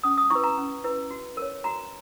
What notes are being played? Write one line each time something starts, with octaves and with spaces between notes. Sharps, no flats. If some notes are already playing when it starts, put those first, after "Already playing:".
C#4 D#6
D#6
E4 B4 C#6
A#5
C#4
E4 B4
F#4
A#4 C#5
F#4 A#5